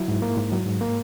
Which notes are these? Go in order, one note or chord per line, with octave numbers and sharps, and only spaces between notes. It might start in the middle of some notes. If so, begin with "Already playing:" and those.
Already playing: F#3 E4
G#2
A#3
G#2
F#3
G#2
A#3